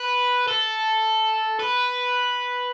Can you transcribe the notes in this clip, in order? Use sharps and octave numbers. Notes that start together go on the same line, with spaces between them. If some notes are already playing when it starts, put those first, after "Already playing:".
Already playing: B4
A4
B4